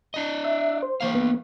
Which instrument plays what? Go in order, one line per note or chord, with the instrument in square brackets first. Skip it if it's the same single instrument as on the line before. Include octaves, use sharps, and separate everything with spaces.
[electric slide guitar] D4 D#5
[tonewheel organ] E5
C5
[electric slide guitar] E3 A#3 F5
[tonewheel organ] B3